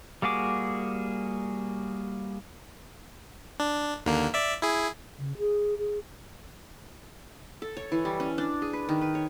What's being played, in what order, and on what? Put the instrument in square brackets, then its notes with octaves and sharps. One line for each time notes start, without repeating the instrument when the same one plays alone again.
[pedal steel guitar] G3 A#3 F#4 G#4 D6
[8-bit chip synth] D4
D#2 D3 A#3
D5 E5
E4 G#4
[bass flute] C#3
G#4
G#4
[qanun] A4
C#5
E3
G3
C#4
D4
G#4
B4
D#3
B4
C#5